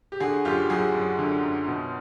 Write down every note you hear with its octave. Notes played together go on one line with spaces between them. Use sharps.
G4
D3 F#4 G#4
F#2 F4 G4
G4
F#3 F#4 G#4
F#2
D3
F#2
B2